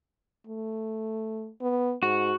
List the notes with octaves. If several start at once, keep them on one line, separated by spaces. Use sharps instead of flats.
A3
B3
G#2 F#4